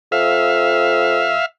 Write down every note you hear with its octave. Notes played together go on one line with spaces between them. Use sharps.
F2 E5 F5